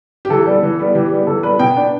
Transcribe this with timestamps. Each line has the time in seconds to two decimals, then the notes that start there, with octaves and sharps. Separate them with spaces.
0.25 G4
0.30 E3 A4
0.46 G3 B3
0.63 E3
0.79 G3 B3
0.95 E3 G4
1.11 G3 B3
1.27 E3 A4
1.43 G3 B3 B4
1.59 B2 G5
1.76 B3 D4